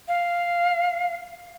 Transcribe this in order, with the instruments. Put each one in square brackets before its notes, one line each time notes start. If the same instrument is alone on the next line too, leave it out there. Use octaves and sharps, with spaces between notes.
[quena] F5